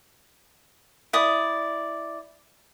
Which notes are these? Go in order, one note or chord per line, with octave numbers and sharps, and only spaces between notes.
E4 D5 D#6